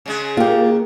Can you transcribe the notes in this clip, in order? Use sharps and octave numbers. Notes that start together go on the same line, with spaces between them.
C#3 G#3 G#4
A#3 F4 G4